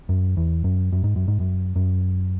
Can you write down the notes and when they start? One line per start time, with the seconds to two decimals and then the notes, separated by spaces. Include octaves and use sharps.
0.09 F#2
0.37 E2
0.64 F#2
0.92 F#2
1.04 G#2
1.16 F#2
1.28 G#2
1.40 F#2
1.76 F#2